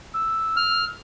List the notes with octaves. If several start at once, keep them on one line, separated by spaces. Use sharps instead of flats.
E6
F6